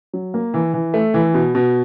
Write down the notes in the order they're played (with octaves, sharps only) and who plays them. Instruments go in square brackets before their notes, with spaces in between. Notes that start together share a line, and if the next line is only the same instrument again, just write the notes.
[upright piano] F#3
A#3
E3
E3
A3
E3
B2
B2